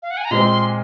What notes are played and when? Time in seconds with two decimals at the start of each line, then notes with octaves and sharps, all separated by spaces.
0.03 F5
0.11 F#5
0.17 G#5
0.25 A#5
0.31 A#2 G#3 C4 C6